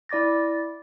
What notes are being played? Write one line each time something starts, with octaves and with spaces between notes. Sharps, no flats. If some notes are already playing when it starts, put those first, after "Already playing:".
E4 D5 D6 A6 A#6